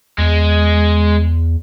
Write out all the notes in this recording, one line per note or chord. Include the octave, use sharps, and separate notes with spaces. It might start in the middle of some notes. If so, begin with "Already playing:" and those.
E2 G#3